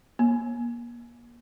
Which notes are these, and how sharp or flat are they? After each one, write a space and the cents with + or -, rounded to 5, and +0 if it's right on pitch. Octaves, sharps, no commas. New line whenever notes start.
A#3 +35